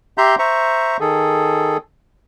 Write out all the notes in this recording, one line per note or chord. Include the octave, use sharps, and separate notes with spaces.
G4 E5 A#5 C6 G6
C5 E5 A#5 C#6
D#3 G#4 A4